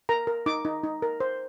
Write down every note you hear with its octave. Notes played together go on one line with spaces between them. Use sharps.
A#4 A#5
A#4
D#4 D6
D#4
D#4
A#4
C5